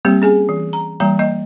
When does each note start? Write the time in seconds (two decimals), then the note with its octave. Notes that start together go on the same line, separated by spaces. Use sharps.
0.05 G3 A#3 C4 G4
0.22 C#4 G#4 G#5
0.49 E3
0.73 A#5
1.00 E3 G3 A#3 A#5
1.19 A#3 D#5